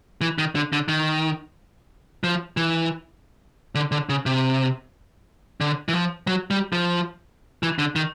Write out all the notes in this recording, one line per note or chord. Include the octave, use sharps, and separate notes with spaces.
E3
D#3
D3
D3
D#3
F3
E3
D3
D3
C#3
C3
D3
E3
F3
F#3
G3
F3
E3
D3
D#3